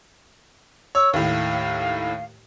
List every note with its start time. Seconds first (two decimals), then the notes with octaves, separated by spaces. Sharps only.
0.95 C#5 E6
1.13 D#2 A2 F5